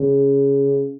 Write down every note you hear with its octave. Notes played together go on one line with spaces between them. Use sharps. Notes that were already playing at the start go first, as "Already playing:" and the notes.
Already playing: C#3